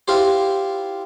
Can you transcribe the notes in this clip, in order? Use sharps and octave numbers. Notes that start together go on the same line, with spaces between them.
E4 F4 G4 C5